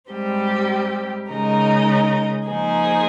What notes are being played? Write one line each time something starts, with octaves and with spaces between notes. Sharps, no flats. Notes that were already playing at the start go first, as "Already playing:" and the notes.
G#2 G3 C4 G4
C#3 G#3 D#4 A#4 D#5
F3 A#3 D#4 G#4 C5